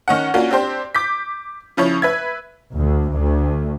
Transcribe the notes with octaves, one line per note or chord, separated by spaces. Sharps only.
D#3 C#4 F#5
A#3 C#4 D4 F4 F#4
C4 D4 G4 C5
D6 G6 B6
C#3 F3 E4 C#5
B4 E5 G#6
D2
D2